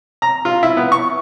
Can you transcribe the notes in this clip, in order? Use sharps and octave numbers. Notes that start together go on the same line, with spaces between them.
A#5
F4
E4
B3
C#6